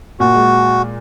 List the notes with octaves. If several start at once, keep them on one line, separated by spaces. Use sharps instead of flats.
A#2 F#4
G#3